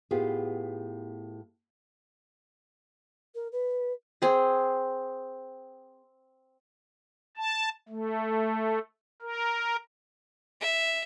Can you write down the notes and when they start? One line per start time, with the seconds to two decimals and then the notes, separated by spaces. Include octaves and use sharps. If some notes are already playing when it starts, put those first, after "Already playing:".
0.11 A2 B3 F4 G4 G#4
3.34 A#4
3.52 B4
4.22 C4 G#4
7.37 A5
7.89 A3
9.22 A#4
10.60 E5